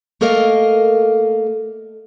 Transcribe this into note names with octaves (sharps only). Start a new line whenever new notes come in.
A3 A#3 A4 A#4 D#5 F5